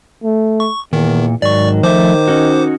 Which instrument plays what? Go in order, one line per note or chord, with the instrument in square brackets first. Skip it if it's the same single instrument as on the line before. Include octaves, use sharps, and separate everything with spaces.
[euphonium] A3
[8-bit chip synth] C#6
[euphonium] E2 [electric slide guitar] A#2 [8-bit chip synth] D#3
[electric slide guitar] G#2 F#3 [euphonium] D#3 [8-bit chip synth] D5 C#6
[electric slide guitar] F3 A3 E5 [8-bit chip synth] C5 D6
[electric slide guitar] C#4 D#4 F#4